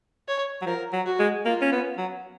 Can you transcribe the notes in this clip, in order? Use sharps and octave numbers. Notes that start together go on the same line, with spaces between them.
C#5
F#3
F3 A#4
F#3
F#4
G#3
A#3 F4
C#4
B3
F#3